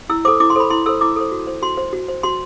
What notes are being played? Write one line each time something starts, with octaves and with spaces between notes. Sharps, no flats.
E4 E6
A4 C5 D6
E4 D6
C6
A4 C5 B5
E4 C6
A4 C5 E6
E4 D6
A4 C5
F#4
C5
F#4 C6
C5
F#4
C5
F#4 C6